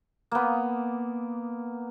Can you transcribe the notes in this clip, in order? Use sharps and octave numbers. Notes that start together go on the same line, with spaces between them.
A#3 B3